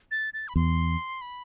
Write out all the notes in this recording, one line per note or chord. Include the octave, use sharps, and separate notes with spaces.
A6
A6
B5
E2 C6
B5